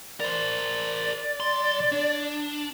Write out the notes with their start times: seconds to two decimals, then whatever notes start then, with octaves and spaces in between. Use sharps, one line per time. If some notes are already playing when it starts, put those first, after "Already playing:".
0.20 A#4 C5 D5
1.40 B1 C6
1.92 D4